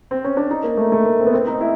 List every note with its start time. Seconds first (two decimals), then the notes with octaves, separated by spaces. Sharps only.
0.11 C4
0.24 C#4
0.37 D4
0.51 D#4
0.64 A#3
0.77 A3
0.92 A3
1.06 A#3
1.19 C4
1.27 B3
1.34 C4
1.47 D#4
1.61 E4